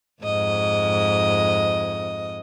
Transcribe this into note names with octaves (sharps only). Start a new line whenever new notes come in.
F2 G#2 D#5